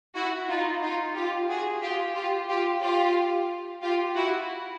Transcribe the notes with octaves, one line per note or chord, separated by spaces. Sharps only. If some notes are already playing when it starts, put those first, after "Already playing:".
E4 F#4
D#4 F4
D#4 F4
F4 G4
F#4 G#4
F4 G4
F4 G4
F4 G4
F4 G4
F4 G4
E4 F#4